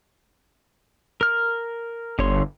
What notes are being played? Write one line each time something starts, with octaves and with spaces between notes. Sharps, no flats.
A#4 F6
G1 D3 C#5 C6